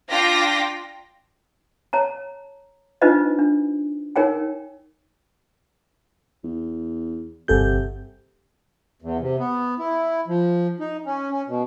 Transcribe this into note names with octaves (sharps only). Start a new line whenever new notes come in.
D4 F4 G5 A#6 B6
C#5 A5 A#5
D4 D#4 F4 B4 C5 D#5
D4
D#4 A#4 C#5 G5 G#5
E2
G1 C3 A4 G6
E2
C3
B3
E4
F3
D#4
C#4
C#4
B2